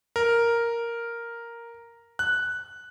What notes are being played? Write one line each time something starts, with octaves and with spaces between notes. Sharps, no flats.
A#4
F#6